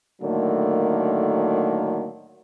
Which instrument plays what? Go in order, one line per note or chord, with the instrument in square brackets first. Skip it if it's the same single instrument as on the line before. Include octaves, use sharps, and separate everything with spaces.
[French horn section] A2 D3 D#3 F#3 A3 A#3